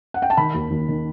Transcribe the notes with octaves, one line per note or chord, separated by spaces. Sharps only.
F#5
G5
A5
D#3 B5
D#2
D#2
D#3